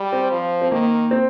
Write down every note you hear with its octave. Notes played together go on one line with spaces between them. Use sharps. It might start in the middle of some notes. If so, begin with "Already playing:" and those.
Already playing: G3
C4
F3
C4
D#3 A#3
C4